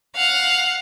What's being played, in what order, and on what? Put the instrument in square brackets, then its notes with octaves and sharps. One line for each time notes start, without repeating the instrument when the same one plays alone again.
[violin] F5 F#5